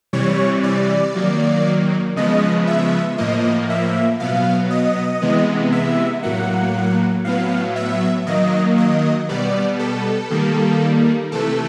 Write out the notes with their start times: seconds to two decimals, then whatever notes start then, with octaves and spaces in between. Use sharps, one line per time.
0.13 C3 E3 G3 C#5
0.63 D5
1.15 D#3 F#3 A#3
2.16 C#3 F3 G#3 B3 D#5
2.67 E5
3.18 A2 F3 A#3 D#5
3.70 E5
4.20 B2 F#3 B3 F5
4.71 D#5
5.22 C3 E3 G#3 B3
5.72 E5
6.23 A2 F#3 A#3 F#5
7.25 A2 F#3 B3 F5
7.76 E5
8.27 D#3 F#3 A#3 D#5
8.78 D#5
9.29 B2 G3 B3 D5
9.79 A4
10.31 D#3 G3 A#3
11.32 C3 E3 A3 A4